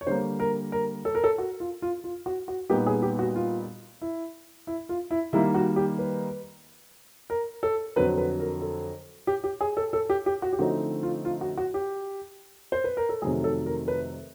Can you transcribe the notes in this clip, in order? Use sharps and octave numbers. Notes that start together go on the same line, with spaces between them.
C#5
D3 G3 A#3 C5
A#4
A#4
A4
A#4
A4
F#4
F4
F4
F4
F#4
F#4
A#2 G3 B3 D#4 G4
G#4
G4
F#4
F4
E4
E4
F4
E4
D#3 G3 A#3 E4
F#4
G4
B4
A#4
A4
F2 D3 F#3 B4
B4
A#4
A4
G4
G4
G#4
A4
A4
G4
G4
F#4
G4
D3 F3 A3 C4 D#4 F#4
F4
F4
F#4
F#4
G4
C5
B4
A#4
A4
F2 C3 D#3 F#3 A3 G#4
A4
A#4
B4